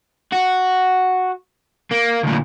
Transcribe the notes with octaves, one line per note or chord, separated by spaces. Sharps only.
F#4
A#3
D2 A#2